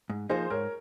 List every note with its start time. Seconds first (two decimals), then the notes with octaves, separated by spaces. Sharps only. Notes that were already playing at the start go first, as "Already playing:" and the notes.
0.09 G#2
0.30 F3 A#3 D#4 G#4 C5
0.50 G#2 A#4 C#5